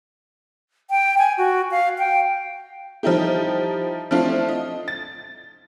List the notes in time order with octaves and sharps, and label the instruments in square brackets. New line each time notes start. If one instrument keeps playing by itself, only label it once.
[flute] G5
G#5
F#4
F5
G5
[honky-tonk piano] F3 G3 D#4 E4 G4
F3 A3 C4 D4 E4 F4
D#5
A6